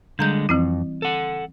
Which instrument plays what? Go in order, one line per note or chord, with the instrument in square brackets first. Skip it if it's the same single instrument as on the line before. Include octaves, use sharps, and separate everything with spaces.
[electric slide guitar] D3 G#3 [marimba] G3 A#5 G6
[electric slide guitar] F2 [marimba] E3 C4 E4
[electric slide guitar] A4 F#5